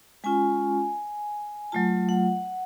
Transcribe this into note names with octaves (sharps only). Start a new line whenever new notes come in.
G#3 C#4 F4 G#5
F#3 A3 F4 A5
F#5